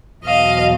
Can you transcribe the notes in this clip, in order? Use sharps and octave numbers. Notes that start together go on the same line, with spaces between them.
E2 B2 F#3 D#5 F5